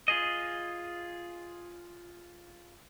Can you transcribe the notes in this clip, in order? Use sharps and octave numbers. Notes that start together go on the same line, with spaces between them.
F4 G#4 D#5